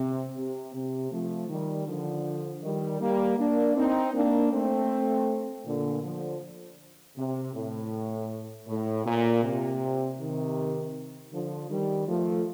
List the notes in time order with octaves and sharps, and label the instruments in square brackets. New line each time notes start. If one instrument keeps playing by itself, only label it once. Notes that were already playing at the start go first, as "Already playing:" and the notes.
Already playing: [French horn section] C3
C3
C3
F3 A3
D#3 G3
D3 F3
D#3 G3
G3 A#3
A#3 D4
C4 D#4
A#3 D4
A3 C4
A#2 D3
D3 F3
C3
A2
A2
A#2
C3
C3 D#3
D3 F3
D#3 G3
F3 A3